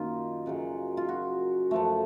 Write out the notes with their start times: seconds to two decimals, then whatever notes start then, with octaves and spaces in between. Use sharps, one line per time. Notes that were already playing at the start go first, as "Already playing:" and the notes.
Already playing: F#2 D#3 A#3 D#4 F4
0.46 F#2 C#3 F#3
0.97 F4
1.09 F#4
1.71 F#2 F3 A3